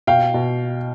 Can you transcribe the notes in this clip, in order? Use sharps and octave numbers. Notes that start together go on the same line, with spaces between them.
B2 F5 G5
B2